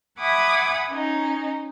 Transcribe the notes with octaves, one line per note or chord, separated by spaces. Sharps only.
E5 F#5 G#5 B5 D6 D#6
C#4 D#4